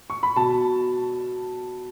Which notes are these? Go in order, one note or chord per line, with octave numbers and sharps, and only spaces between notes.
C#6
B5
B2 A5